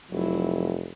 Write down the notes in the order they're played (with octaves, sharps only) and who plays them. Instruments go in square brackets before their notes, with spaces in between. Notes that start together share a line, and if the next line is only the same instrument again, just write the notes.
[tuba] F1 [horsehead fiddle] F#3 E4